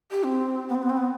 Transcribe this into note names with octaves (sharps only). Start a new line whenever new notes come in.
G4
C4
B3
C4
B3
C4
B3